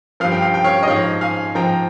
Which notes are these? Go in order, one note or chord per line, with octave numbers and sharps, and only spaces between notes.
G2 F3 F5
G5
F5
G5
C#5 F5
D#5
G#2 F3 C#5 F5
F5 G#5
G#2 F3 G5 A#5